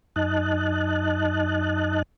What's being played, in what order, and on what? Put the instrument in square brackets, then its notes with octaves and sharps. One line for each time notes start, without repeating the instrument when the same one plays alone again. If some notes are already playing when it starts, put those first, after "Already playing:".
[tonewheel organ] F#2 D#4 D#5 A5 F#6